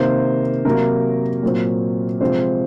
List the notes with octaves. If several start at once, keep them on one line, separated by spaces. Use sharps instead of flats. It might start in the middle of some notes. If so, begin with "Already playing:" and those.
Already playing: C3 D#3 A#3 C5
C3 F#3 A#3 A#4
A#2 F#3 C4
C3 F3 G#3 C4 C5